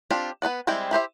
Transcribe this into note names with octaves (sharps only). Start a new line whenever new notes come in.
C4 D4 F4 G4
B3 B4 D5 F#5
G3 G#3 C4 E4 G5
E4 G4 C5 E5